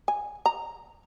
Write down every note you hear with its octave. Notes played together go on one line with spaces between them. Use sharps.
G#5
A#5